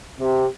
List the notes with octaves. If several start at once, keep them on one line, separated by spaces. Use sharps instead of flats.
C3